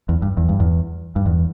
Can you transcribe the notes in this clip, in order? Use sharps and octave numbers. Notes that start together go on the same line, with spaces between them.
E2
G2
E2
G2
E2
G2
E2